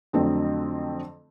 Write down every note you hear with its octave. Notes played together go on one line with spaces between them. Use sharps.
F2 D3 F#3 A3 C4